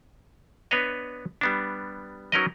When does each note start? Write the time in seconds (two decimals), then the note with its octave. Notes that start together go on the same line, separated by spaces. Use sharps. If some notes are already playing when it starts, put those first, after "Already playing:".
0.71 B3 D4 B4 C#5 D#5
1.41 G3 B3 D4
2.32 F#3 C#4 D#4 A#4 B4 D#5